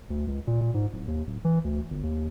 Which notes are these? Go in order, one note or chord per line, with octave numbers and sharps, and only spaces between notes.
D2
C#2
A#2
A#2
G#2
D1
D#2
D1
E3
D2
G1
D#2